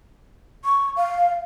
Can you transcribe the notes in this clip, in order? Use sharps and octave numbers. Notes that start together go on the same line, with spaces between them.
C#6
F5